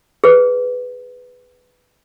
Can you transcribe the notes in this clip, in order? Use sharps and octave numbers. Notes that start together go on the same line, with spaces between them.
G#4 B4